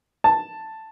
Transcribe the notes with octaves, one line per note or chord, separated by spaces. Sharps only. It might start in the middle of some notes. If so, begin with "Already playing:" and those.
A5